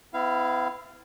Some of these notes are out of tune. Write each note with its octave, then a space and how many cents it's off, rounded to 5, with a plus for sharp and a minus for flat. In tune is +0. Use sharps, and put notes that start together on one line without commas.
B3 +45 E4 +0 F5 -15